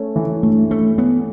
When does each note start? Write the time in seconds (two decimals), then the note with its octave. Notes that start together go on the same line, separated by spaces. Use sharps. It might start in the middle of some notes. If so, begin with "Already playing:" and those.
Already playing: A3 C#4
0.16 E3
0.43 G2 A3
0.70 A3 C#4
0.98 B3 C#4